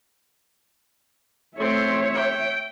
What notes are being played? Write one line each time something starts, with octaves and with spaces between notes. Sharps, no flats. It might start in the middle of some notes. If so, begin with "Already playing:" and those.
A3 C4 C#5 E5
G5